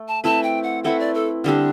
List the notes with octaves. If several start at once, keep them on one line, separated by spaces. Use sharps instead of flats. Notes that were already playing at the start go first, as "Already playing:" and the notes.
Already playing: A3
A5
A3 C4 E4 B4 A5
G5
F#5
A3 C4 E4 B4 F#5
D5
A4
D3 G3 C4 D4 G4